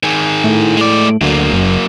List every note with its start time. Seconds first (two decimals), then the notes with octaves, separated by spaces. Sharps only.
0.03 D#3 G#4
0.44 A2
0.77 G#3 D5
1.21 D2 F#3 A#3
1.53 F#1